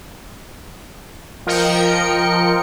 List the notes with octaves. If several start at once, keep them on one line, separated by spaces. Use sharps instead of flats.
F3 A#4 D#5 G5 C#7